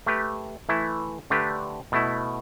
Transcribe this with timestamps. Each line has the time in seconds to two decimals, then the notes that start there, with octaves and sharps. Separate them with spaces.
0.07 A3 G4 B4
0.69 E3 A3 E4
1.30 D3 A3 D4 G4 B4
1.92 B2 A3 E4